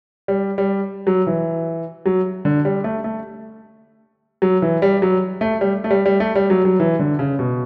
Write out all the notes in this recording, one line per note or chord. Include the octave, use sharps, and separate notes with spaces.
G3
G3
F#3
E3
F#3
D3
G3
A3
A3
F#3
E3
G3
F#3
A3
G3
A3
G3
G3
A3
G3
F#3
F#3
E3
D3
C#3
B2